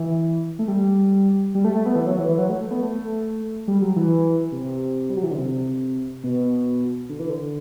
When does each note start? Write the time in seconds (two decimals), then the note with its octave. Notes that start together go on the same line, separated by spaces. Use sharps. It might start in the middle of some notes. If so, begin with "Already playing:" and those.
Already playing: E3
0.59 A3
0.68 G3
1.55 G3
1.64 A3
1.75 A3
1.86 B3
1.96 E3
2.07 F#3
2.18 E3
2.28 E3
2.39 F#3
2.49 A3
2.61 A3
2.71 B3
2.82 A3
3.68 G3
3.82 F#3
3.96 E3
4.52 C3
5.10 G3
5.17 F#3
5.24 E3
5.31 D3
5.38 C3
6.24 B2
7.09 D3
7.19 E3
7.29 D3